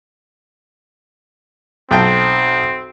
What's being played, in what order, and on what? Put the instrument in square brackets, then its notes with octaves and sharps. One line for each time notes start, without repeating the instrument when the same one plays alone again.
[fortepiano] B1 G5 A5 [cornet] C4